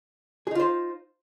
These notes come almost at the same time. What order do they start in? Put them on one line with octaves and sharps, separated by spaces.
G#4 D#4 F4 C5